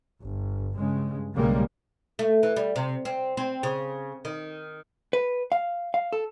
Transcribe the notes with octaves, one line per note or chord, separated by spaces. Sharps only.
G1
G2 C#3 G#3
B1 A2 C#3 G3 G#3 A#3
A3
E3
G3
C3
C4
C4
C#3
D#3
B4
F5
F5
A4